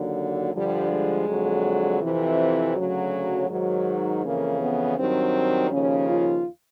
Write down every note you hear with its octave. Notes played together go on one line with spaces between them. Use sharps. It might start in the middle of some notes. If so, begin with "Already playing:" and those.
Already playing: D#2 D3 F#3
G2 D3 F3 G3
G#3
F2 D3 F#3
F2 C3 E3
D2 C#3 F#3
G#2 D#3 F#3
F2 C#3 E3 A#3
B3
G2 D#3 F#3 C4
D#2 C#3 F3 C#4
F4